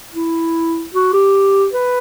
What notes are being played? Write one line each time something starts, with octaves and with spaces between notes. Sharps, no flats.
E4
F#4
G4
B4